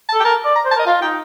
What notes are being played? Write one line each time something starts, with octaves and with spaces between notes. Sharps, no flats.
A5
A4
G5
A#4 A5
D5
A#5
C5
A5
A#4 D#5
F4 F5
D#4 G5